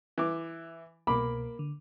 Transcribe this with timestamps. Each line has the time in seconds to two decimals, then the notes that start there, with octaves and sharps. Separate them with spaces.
0.18 E3 D6
1.07 C2 B2 A#3 B5 D6
1.59 D3